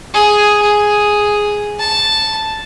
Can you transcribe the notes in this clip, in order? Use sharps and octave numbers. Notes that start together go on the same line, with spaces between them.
G#4
G#4
A5